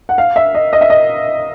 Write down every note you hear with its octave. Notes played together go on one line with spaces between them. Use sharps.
F#5
F5
E5
D#5
D#5
E5
D#5